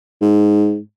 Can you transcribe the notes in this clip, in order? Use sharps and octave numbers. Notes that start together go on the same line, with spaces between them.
G#2